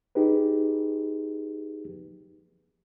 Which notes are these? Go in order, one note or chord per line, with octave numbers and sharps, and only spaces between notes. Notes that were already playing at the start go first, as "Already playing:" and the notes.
D#4 G4 G#4 B4